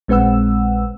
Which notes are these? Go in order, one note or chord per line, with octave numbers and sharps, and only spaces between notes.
A#1 G#3 C4 B4 F#5 E6